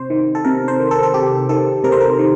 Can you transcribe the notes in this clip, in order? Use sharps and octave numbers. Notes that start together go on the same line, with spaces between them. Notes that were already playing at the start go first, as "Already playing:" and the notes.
Already playing: C3 C5
D#3
A4
C3 A#4
C5
D#3
A4
A4
C3 G4
D#3 A4
C3 A#4
C5
A#4
D#3